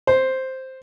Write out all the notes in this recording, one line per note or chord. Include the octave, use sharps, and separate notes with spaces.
C5